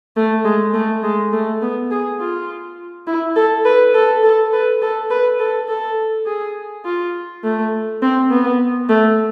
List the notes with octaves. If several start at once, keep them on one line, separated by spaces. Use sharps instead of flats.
A3
G#3
A3
G#3
A3
B3
G#4
F4
E4
A4
B4
A4
A4
B4
A4
B4
A4
A4
G#4
F4
A3
C4
B3
A3